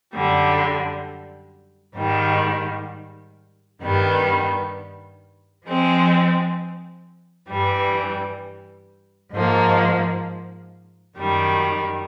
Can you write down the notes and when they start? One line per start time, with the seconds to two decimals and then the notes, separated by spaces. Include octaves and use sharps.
0.13 F#2 D3 G3
1.96 G#2 D#3 G3
3.80 G2 D#3 G3 B3
5.65 F3 G#3 C4
7.48 G2 E3 G3
9.32 G#2 F3 A#3
11.17 F#2 D#3 G3